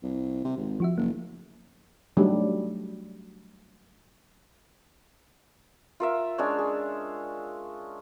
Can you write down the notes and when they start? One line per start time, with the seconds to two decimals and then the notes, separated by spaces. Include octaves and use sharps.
0.03 C2
0.44 C3
0.57 G#1
0.80 F3 F#4 E5
0.98 F#1 A#3
2.17 F#3 G3 A3 D4 D#4 F#4
6.00 F4 A#4 E5
6.38 G#3 C#4 D4 C#5
6.58 G#4